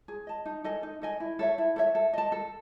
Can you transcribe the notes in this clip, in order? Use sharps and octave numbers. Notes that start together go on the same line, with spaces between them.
G#4
D#5 A5
D#4
A4 D#5 G#5
D#4
A4 D#5 G#5
E4
A4 C#5 E5
E4
A4 C#5 E5
A4
D#5 A5
A4